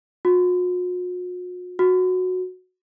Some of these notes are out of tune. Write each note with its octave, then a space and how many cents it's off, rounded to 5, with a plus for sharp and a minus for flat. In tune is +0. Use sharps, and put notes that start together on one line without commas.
F#4 -45
F#4 -10